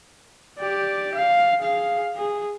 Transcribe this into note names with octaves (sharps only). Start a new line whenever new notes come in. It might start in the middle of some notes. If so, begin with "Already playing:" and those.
G4 D5
F5
G#4 F5
G#4